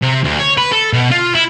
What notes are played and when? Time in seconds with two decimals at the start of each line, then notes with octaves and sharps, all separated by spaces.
0.02 C3
0.24 D2
0.39 C#5
0.58 B4
0.72 A4
0.93 B2
1.11 F4
1.35 E4